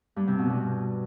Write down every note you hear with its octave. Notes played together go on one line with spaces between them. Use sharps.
G2
C3
B2
G2